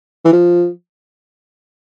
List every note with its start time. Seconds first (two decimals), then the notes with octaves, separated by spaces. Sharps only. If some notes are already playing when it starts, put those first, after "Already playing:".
0.25 E3
0.33 F3